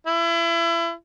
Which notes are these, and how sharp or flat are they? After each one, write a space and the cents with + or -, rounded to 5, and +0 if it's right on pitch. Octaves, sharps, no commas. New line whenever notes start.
E4 +30